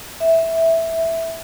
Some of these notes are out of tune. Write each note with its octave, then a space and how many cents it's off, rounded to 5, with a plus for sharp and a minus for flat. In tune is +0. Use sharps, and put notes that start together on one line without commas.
E5 -10